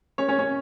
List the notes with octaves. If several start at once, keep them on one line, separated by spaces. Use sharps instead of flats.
C#4 C#5
C#4 C#5
C#4 C#5